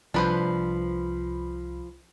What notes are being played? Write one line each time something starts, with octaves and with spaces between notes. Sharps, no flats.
C2 F3 D4 B4 C5 B5